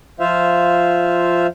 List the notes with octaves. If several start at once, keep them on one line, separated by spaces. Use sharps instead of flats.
F3 F4 C5 E5 F5